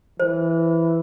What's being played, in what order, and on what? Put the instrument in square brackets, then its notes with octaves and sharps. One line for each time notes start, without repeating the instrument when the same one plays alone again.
[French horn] E3 [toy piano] C5